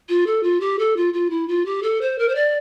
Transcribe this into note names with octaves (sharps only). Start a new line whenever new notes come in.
F4
A4
F4
G4
A4
F4
F4
E4
F4
G4
A4
C5
A#4
C5
D5